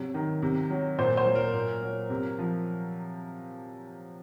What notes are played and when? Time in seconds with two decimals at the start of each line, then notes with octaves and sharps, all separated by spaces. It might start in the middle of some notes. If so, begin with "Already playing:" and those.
Already playing: C3 F#3
0.14 D#3
0.42 C3
0.70 F#3
0.98 A#2 C5
1.17 C5
1.26 F#3
1.35 A#4
1.54 A#2
1.82 F#3
2.10 C3
2.38 F3